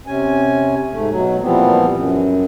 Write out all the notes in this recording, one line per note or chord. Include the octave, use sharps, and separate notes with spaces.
C3 C#4 G#5
G#2 A3
B2 F#3
A#2 E3 F3 G3 B3 C4
F#2